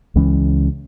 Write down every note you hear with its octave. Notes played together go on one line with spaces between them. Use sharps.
C#2 E3 G#3 C#4